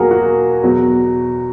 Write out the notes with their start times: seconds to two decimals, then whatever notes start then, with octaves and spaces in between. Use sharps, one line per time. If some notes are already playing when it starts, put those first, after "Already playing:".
Already playing: E2 B2 F#3 A#3 F#4 G#4 A#4
0.11 F#4
0.63 E2 B2 F#3